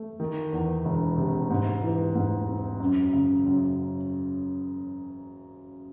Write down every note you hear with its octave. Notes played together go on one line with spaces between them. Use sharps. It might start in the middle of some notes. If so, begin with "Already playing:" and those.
Already playing: A3
D#3
E2
E1
C3
G#2
E3
G#2
C4
F#2
C#3
F#2